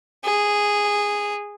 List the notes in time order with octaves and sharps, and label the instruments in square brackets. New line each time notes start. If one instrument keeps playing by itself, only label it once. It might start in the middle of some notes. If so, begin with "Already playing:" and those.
[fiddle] G#4